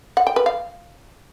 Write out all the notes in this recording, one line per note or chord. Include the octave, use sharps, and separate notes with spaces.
F#5
G5
B4
F5